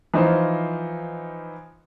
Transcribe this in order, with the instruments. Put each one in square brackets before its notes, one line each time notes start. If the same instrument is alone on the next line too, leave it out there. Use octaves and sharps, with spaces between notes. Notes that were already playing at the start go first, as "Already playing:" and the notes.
[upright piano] E3 F3 D#4 F4 C5